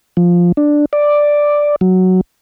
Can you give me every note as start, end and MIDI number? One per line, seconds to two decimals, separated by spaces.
0.17 0.52 53
0.57 0.85 62
0.93 1.76 74
1.81 2.21 54